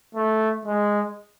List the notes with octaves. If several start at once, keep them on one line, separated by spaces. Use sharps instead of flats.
A3
G#3